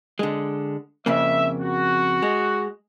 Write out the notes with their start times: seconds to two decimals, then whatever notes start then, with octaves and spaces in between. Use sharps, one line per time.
0.19 D3 G#3
1.06 F2 C#3 A#3 E5
1.59 F#4
2.22 G#3